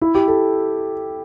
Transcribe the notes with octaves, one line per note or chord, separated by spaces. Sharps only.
E4
G4
A4